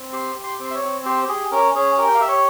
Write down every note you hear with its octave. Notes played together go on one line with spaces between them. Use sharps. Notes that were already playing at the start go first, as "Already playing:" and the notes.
Already playing: C4
G4 C6
G4
C6
C4
C6
E5
C#5
C4
G4 C5
G4 G#4
C#4 A#4
C#4 G#4
G4 A#4
G5
F5
G4 E5
C#5